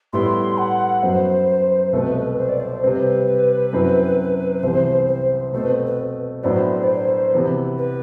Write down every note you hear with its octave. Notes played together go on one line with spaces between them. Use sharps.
A2 G3 B3 E4 C6
F#5
F#2 F#3 B3 C5
C2 B2 A3 B4
C5
D5
C5
C3 G3 C4 B4
F#2 F#3 C4 E4
C2 C3 E3 B3 C5
C5
B2 A3 C4 C5
B4
B4
A2 F#3 B3 D4 C5
D5
C5
C3 E3 B3
B4